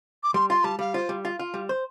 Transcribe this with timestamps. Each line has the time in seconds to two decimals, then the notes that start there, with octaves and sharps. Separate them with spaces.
0.23 D6
0.34 G3 C6
0.50 F4 C6
0.64 G3 A5
0.79 G3 F5
0.94 F4 C5
1.09 G3
1.25 F4
1.39 F4
1.54 G3
1.69 C5